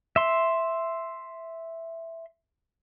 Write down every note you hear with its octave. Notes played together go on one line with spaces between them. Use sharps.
E5 C6